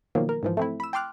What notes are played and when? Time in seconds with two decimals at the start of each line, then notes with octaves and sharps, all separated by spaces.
0.15 B2 D#3 F3 F#3 A#3
0.29 A#4
0.43 G#2 E3 F3
0.57 A3 C4 E4
0.80 B5 E6
0.93 G5 A5 C6 D6 F6 F#6